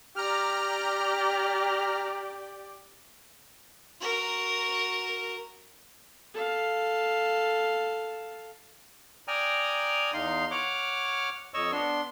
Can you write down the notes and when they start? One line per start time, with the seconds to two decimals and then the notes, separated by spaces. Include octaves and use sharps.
0.16 G4 D5 A#5 F6
4.00 F#4 A#4
6.35 A4 F5
9.28 D5 G5 G#5 A#5 D#6 F6
10.14 E2 D#4 F5 C6
10.51 C#5 F#5 D6 F6
11.54 F2 C#5 D#5 C#6 E6
11.72 B3 D4 C6